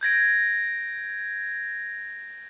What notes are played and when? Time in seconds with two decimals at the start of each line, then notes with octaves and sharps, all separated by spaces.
0.01 G6 G#6 A#6 D7